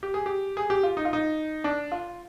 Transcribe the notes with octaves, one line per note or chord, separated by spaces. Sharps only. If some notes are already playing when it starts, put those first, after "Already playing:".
G4
G#4
G4
G#4
G4
F4
D#4
F4
D#4
D4
F4